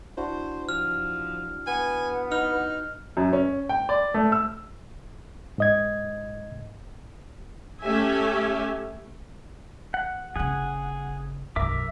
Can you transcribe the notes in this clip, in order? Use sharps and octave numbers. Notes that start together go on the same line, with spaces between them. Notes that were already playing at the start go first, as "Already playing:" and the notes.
D4 E4 F#4 C5
F3 F6
B3 G#5
D#4 F6
F#2
C#4
G5
D5
A3
E6
G#2 D#5 G#6
A3 C#4 G4 E5 G#5
F#5
G1 C#3 G#4 F#5
B1 F#2 A#4 E5 D6